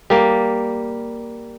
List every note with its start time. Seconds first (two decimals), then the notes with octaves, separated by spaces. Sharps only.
0.10 G3 A#3